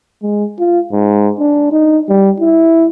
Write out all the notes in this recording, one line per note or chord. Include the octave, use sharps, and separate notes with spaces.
G#3
F4
G#2
D4
D#4
G3
E4